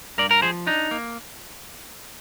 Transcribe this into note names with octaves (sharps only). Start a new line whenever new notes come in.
G2 A#4 D5
A#4
F3 G#4 C5
D4 D#4
A#3